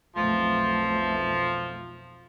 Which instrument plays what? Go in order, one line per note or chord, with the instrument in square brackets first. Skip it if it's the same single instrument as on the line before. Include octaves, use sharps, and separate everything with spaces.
[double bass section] B1 F2 A3 [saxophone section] F3